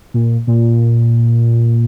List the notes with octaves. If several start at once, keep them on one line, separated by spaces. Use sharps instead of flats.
A#2
A#2